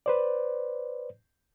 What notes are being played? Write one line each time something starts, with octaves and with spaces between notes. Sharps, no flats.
B4 C5 D5